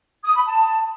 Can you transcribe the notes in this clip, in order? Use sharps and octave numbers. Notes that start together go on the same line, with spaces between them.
D#6
B5
A5